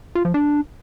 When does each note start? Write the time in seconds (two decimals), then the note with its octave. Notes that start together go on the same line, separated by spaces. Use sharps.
0.15 F4
0.25 F3
0.34 D4